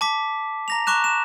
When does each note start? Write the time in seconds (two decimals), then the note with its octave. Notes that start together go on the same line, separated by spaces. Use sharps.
0.01 A5 D6 B6
0.68 A#5 A#6 F7
0.87 A#5 C#6 D6 F#6 E7
1.04 E7